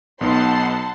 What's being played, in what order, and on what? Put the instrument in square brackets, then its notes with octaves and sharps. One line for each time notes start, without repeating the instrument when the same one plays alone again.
[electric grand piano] B1 B3 D#4 [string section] F#5 A5 C6